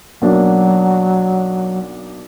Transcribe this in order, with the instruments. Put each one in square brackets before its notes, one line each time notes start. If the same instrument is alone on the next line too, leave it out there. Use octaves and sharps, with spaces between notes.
[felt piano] B1 A#3 D4 [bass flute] F#3